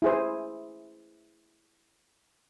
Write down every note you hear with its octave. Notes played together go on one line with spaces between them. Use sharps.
E4 G#4 C5